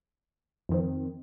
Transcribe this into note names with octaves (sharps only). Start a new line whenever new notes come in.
F2 D#3 C4